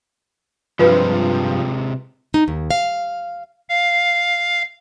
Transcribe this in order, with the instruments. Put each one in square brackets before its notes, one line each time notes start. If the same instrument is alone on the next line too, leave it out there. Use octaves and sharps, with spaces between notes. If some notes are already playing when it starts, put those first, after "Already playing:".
[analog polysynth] G2 F3 [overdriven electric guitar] C3 G#3 [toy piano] F4 B4
[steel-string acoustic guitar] D#4
D#2
F5
[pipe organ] F5